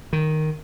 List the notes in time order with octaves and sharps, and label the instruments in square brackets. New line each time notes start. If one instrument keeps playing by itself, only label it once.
[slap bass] D#3